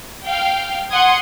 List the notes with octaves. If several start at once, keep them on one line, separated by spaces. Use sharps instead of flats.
F5 G5
F#5 C6 D#6 G#6